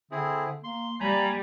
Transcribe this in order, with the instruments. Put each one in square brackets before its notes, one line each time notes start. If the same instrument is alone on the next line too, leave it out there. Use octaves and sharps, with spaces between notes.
[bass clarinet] D3 [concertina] C4 E4 G#4
[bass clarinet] A#3 [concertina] C6
[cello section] G3 [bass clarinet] A#3 [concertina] G#5 A#5 B5